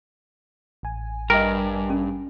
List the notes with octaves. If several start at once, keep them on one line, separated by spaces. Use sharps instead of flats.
A1 G#5
G2 A#4 D#5 G5
C#4